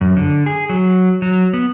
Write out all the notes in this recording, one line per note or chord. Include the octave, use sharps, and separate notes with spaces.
F#2
D3
G#4
F#3
F#3
B3